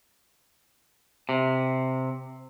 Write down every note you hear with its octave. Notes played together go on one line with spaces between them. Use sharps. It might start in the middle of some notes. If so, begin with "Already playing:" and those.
C3